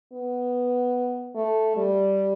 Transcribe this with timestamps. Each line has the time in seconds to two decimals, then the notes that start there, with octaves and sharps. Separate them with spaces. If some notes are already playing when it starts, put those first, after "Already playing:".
0.12 B3
1.35 A3
1.77 G3